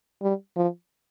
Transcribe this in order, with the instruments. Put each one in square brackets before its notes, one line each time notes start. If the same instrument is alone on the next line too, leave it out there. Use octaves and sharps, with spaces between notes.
[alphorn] G3
F3